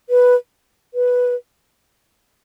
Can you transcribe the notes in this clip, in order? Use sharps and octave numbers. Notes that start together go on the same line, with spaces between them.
B4
B4